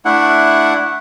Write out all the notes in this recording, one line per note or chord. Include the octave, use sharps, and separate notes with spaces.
A3 D4 E4 F#5